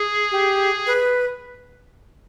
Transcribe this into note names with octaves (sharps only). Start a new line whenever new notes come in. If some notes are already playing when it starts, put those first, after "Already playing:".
Already playing: G#4
G4
B4